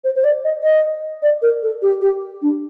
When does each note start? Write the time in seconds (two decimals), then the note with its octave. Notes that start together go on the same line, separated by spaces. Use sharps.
0.04 C5
0.15 C5
0.24 D5
0.44 D#5
0.63 D#5
1.22 D5
1.42 A#4
1.62 A4
1.82 G4
2.01 G4
2.42 D4